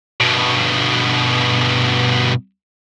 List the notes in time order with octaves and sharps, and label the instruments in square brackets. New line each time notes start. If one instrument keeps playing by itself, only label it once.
[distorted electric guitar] G2 B2